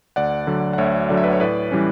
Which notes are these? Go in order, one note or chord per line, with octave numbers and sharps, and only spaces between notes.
D2 D5 F#5
D3 F#3
F#5
D2 C#5 E5
D3 F#3 D5
E5
B4 D5
C#5
A2 B4 D5
E3 G3 C#4